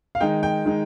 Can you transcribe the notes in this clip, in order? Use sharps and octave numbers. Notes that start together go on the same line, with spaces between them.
F5
D#3 G#3 D#4 G5
G5
D#3 G#3 D#4